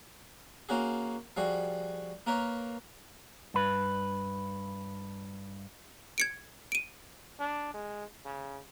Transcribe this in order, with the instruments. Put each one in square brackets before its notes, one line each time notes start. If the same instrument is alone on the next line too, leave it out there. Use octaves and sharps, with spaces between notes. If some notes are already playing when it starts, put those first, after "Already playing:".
[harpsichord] A#3 C#4 F#4 G#4
F3 G3 F#4 G#4
A#3 A#4 B4 C#5
[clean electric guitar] G2 B4
[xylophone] G#6 C#7 D7
D7 D#7
[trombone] D4
G#3
C#3